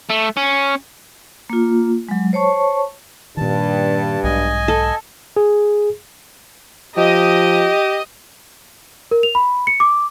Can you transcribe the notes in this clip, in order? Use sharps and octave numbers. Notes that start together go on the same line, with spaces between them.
A3
C#4
A#3 F4
F#3 G#3
C5 C#5 A5 C#6
G2 A#2 D#3 A5
B1 G#2 D#5 G#5
A4
G#4
F3 G4 D#5
A#4
F7
B5
C#7
D6